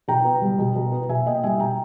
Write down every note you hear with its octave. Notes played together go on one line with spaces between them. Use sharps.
B2 G5 A#5
B3
G3
B2
B2
B3
B2 E5 G#5
A#3 D#5 G5
G3 E5 G#5
B2 G5 A#5